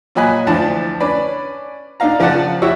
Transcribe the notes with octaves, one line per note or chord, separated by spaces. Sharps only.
A#2 F#3 D#5 G#5 B5 F#6
D2 E3 F3 D4 A5
C#4 D4 B4 D5
D4 D#4 F5 A#5
C#3 F3 F4 D5 F#5 A5
E4 F#4 G4 C#5 E5